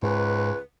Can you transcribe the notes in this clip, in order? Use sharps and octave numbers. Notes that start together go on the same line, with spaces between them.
C#2 G#2 B4